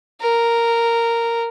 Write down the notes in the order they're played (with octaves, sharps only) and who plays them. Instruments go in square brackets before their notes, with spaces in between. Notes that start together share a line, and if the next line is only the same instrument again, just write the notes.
[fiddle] A#4